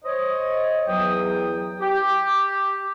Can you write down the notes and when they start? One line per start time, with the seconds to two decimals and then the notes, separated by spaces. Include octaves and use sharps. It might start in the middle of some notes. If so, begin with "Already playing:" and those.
0.04 C5 C#5 D#5
0.88 E2 F#3 G5 D#6
1.82 G4